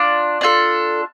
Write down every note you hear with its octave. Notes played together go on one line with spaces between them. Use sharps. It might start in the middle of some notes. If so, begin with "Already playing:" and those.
Already playing: D4 F4 D5
D4 F4 A4